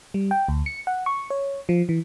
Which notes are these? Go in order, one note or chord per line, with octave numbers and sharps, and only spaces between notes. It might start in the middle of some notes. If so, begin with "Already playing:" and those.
G3
G5
D2
C#7
F#5
C#6
C#5
F3
E3